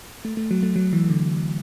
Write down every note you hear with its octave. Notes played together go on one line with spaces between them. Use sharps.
A3
A3
F#3
A3
F#3
E3
D3